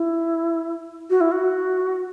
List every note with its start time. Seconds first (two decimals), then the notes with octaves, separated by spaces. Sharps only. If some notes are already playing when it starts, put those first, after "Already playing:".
Already playing: E4
1.10 F#4
1.21 E4
1.32 F#4